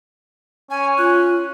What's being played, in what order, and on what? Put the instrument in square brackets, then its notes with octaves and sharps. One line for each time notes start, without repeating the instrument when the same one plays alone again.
[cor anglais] C#4 [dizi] G#5
[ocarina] F4 [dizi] F#6